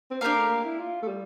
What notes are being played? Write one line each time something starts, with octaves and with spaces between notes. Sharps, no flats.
C4
A#3 D4 G4 A#4 F5
A3
A#3
E4
F4
A3
G3